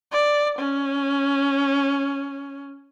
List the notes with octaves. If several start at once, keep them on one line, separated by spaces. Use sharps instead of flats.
D5
C#4